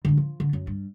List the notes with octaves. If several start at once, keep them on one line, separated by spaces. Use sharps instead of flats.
G2 D3
F3
D3
F#2
G2